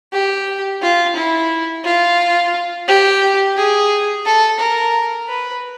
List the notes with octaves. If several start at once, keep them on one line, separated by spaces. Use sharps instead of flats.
G4
F4
E4
F4
G4
G#4
A4
A#4
B4